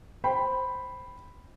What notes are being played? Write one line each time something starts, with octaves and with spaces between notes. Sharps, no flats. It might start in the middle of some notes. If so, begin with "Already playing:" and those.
C5 G5 B5